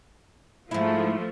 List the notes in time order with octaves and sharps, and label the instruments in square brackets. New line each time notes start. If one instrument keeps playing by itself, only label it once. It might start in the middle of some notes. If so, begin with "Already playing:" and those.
[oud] G#2 E4 [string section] F3 A3